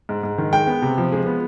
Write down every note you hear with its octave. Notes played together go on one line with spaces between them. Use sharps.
G#2
G#2
D#3
G#3 G5
B3
C3
F3
G#3
B3